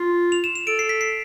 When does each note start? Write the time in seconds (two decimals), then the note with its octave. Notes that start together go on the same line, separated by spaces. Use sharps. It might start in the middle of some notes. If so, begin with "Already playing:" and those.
Already playing: F4
0.32 F7
0.44 E7
0.56 E7
0.67 A4 D7
0.79 C7
0.89 B6
1.01 C7